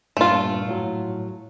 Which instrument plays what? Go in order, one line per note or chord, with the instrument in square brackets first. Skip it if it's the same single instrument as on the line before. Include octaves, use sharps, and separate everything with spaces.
[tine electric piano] G2 A#2 [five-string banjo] A3 F4
[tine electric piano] A2 F#3